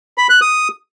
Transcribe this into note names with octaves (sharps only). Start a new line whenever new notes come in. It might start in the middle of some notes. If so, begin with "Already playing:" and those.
B5
F#6
D#6